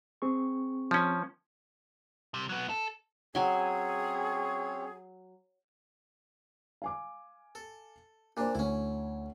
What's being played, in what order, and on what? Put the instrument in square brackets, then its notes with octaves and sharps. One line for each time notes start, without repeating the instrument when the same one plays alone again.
[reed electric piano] C4 G#4 C#6
[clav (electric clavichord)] F3 C#4
[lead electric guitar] C3 G3
F#3 B3
A4
[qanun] F#3 G#5 [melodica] C4 C#4 C#5 [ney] G#4
[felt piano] F5 G#5 D6
[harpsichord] A4
[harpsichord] A#2 D4 [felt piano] A#4 C5
[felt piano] D2 [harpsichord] C#4 E4